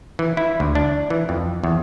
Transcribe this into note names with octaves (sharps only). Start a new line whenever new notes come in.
E3
E4
D2
D4
E3
F2
E2